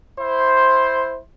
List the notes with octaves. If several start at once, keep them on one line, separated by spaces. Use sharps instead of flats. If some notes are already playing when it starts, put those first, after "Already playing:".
E4 C5